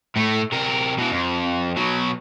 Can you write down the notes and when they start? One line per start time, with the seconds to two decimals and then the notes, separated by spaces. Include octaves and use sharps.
0.16 A2 A3
0.52 C3 A#4
0.98 B2 E3
1.11 F2
1.76 B2 F#3